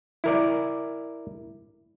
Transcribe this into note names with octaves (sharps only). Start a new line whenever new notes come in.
E4 A#4 D5